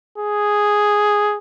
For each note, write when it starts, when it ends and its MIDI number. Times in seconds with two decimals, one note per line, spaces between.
0.18 1.38 68